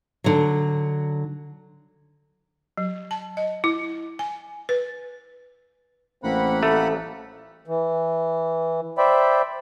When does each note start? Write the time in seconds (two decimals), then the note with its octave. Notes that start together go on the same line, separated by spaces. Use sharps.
0.24 D3 F#3
2.77 F#3
3.11 A5
3.37 D#5
3.64 E4
4.19 G#5
4.69 B4
6.24 A1 A#3 C4 F#5 B5
6.63 F2 A3
7.68 E3
8.98 C5 D5 E5 G5 B5